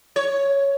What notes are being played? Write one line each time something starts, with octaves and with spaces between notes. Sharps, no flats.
C#5